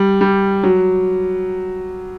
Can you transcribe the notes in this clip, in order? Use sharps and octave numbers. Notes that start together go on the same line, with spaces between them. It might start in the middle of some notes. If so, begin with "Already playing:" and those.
Already playing: G3
G3
F#3